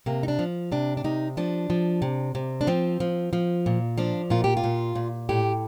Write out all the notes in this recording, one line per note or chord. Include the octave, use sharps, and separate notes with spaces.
C3 A#3
D#4
D4
F3
C3 D4
D4
C3 D#4
F3 D4
F3
C3
C3
D4
F3 C4
F3
F3
A#2
F3 D4
A#2 F4
G4
F4
A#2
A#2
A2 G4